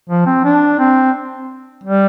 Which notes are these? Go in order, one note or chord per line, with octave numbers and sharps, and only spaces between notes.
F3
C4
D4
C4
G3